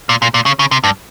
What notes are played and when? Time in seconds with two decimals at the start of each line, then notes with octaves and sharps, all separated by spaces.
0.09 A#2
0.22 A#2
0.34 A#2
0.46 C#3
0.59 C#3
0.71 C3
0.84 G2